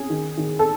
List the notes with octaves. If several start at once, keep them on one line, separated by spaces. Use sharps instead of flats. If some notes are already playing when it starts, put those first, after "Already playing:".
Already playing: C#4 G#4
D#3
D#3
A4